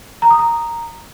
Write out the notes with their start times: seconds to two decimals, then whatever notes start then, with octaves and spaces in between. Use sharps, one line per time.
0.22 A#5
0.31 D#6
0.39 A#5